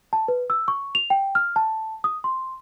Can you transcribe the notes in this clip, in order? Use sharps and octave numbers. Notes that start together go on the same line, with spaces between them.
A5
B4
E6
C#6
F7
G5
F6
A5
D#6
C6